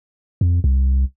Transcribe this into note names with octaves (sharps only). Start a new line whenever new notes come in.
F2
C2